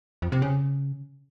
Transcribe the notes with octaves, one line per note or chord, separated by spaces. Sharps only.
F2
C3
C#3